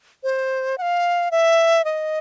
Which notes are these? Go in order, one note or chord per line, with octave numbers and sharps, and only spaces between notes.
C5
F#5
F5
E5
D#5